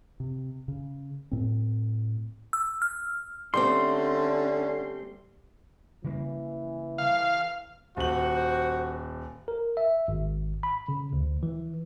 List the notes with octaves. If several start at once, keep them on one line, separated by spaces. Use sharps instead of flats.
C3
C#3
A2 C4
E6
F6
D3 G3 A3 C4 C#4 C6
C#3 E3 G3 A#3
F5
D#1 F#4 C5 F#7
A#4
E5
G#1
B5
C#3
D2
E3